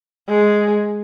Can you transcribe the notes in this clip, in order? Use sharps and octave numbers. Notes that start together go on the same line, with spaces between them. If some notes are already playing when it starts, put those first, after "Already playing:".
G#3